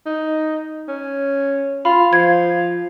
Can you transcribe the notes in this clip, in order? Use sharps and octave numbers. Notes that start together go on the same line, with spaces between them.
D#4
C#4
F4 B5
F3 F5 G#6